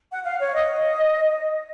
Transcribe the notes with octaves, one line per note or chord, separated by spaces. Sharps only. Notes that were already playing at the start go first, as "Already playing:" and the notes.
F#5
F5
C#5
D#5